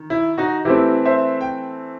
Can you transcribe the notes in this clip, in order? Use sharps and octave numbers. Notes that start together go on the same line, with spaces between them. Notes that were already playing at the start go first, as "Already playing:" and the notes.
Already playing: D#3
E4
D#4 F#4
E3 A3 C4 E4 G4
C5 E5
G5